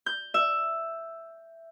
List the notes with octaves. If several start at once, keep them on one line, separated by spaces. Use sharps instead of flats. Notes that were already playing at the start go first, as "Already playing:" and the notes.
G6
E5